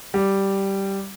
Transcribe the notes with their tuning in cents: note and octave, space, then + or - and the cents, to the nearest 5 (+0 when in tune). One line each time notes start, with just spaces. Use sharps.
G3 -5